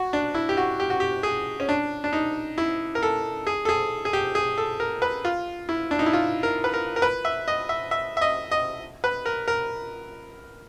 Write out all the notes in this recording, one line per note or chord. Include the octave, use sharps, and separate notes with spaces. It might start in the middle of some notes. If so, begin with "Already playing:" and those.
Already playing: F#4
D4
E4
G4
F#4
G4
F#4
G4
G#4
C#4
D4
D4
D#4
E4
A#4
A4
G#4
A4
G#4
G#4
G4
G#4
A4
A#4
B4
F4
E4
D4
D#4
E4
F4
A#4
B4
A#4
A#4
B4
E5
D#5
E5
E5
E5
D#5
D#5
B4
A#4
A#4